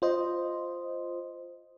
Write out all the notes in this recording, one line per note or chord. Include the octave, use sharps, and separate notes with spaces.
F4 C5 D#5